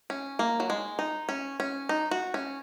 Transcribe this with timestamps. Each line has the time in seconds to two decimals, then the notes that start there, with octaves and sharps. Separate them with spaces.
0.10 C#4
0.39 A#3
0.60 F#3
0.70 G#3
0.99 D#4
1.29 C#4
1.60 C#4
1.89 D#4
2.11 F#4
2.34 C#4